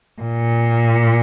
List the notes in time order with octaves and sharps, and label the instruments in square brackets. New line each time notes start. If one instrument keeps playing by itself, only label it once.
[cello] A#2